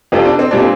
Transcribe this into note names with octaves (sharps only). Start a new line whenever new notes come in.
F2 C3 F3 C4
D4
C4
A#2 G3 D4
C4